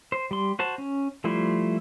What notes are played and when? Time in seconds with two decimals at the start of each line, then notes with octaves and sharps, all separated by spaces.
0.12 C5
0.31 G3 C6
0.59 F#4 C5 A5
0.78 C#4
1.24 F3 G3 A3 E4 C5